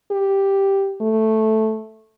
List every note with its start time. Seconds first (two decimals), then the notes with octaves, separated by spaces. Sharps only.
0.11 G4
1.01 A3